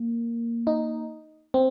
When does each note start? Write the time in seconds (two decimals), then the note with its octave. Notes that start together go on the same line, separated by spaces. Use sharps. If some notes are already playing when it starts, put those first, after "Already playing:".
Already playing: A#3
0.67 D#4
1.54 C4